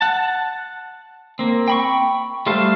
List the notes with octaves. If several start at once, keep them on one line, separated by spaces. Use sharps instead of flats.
F#5 A5
A#3 C4
G5 B5 C#6
G3 A3 C5 F5 A5